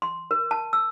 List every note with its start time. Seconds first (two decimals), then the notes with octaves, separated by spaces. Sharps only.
0.02 C6
0.31 A#4
0.51 A5
0.73 E6